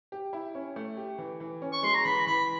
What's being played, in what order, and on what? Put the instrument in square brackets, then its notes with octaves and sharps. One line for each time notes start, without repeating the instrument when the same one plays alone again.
[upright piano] G4
E4
C#4
A3
G4
E3
E3
C#4
[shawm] C#6
[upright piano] G#3 [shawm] C6
[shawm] A#5
[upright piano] E3 [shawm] B5
[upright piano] E3 [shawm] B5